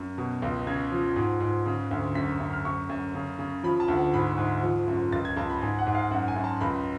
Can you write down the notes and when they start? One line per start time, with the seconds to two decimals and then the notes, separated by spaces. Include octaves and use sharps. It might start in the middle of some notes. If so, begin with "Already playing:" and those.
Already playing: F#2
0.18 B2
0.42 C#2
0.67 C#3 G#6
0.92 F3
1.16 G#2
1.40 G#2
1.66 C#3
1.91 D2
2.15 F#2 B6
2.40 F#2
2.53 F6
2.65 F#2 C#6
2.89 F#2
3.15 C#3
3.39 C#3
3.63 F3 B5
3.80 A5
3.88 D2
3.96 F#5
4.13 G#2 B5
4.38 G#2
4.63 F3
4.88 F#2
5.12 C#2 A6
5.25 G#6
5.37 C#2 A5
5.50 B5
5.62 G#2 G#5
5.79 F#5
5.87 G#2
5.95 F5
6.11 F#2 F#5
6.28 G#5
6.36 F#2
6.44 A5
6.61 C#2 B5